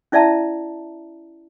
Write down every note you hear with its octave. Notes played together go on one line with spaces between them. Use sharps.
C#4 E4 D5 E5 A5 A#5